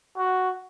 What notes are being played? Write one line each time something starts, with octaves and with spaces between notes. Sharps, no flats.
F#4